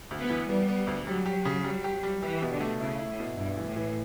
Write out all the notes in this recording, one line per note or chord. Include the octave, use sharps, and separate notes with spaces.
D2
B3
E3
G3 B3
B3
D2
F#3 G3
G4
C#3
G3
G4
G3
E3 G4
B2
D3
A3
C#3 E4
E4
A2
B2
G2 E4
E3
A2
E3